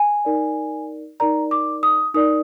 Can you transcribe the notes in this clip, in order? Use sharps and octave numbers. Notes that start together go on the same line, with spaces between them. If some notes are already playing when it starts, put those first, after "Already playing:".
Already playing: G#5
D#4 A#4 D5
D#4 A#4 D5 A#5
D6
D#6
D#4 A#4 D5 D#6